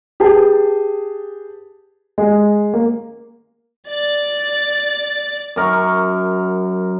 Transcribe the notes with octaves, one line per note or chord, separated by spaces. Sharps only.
G4 G#4 B4 A5
G#3
A#3
D5 A6
F#2 A#4 C#6